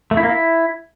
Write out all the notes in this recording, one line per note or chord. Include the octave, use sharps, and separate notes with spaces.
A3
E4
A#3
E4